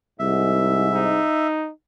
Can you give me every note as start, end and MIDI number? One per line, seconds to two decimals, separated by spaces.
0.19 1.21 36
0.19 1.21 44
0.19 1.47 76
0.94 1.71 63